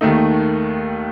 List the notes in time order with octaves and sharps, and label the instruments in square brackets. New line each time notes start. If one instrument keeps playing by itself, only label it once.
[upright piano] D#2 D#3 A3 D#4